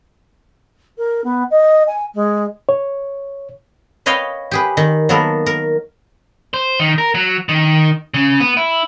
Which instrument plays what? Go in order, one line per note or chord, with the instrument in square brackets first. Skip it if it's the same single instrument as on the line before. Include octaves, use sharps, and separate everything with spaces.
[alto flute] A#4
B3
D#5
G#5
G#3
[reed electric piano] C#5
[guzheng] B4 C#5 D#5 F5 G5
G4 G#4 B4
D#3
F#3 A#3 B3 A4 A#4
A#4
[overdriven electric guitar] C5
D#3
A#4
F#3
D#3
C#3
B3
E4